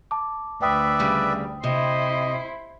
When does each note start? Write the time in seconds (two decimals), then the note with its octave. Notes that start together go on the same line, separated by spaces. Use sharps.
0.11 A5 D6
0.62 D2 B4 D5 E5 G5 D#6
0.99 C#3 G3
1.64 C3 E4 C5 D#5